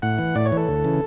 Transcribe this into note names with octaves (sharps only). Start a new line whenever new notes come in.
A2 F#5
E3
A2 D5
C#5
E3 A4
D2
C#3 E3